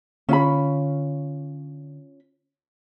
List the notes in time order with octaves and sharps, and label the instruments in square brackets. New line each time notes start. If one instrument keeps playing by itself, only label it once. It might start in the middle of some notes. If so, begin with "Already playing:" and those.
[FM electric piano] D3 [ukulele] C#4 F4 B5